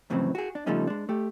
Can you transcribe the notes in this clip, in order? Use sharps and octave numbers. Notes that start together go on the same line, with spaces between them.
F2 A2 C#3 E3 F#3 C4
F#4 G#4
D4
C#3 F3 G3 A3 C#4 D#4
G#3 D4
A3 G4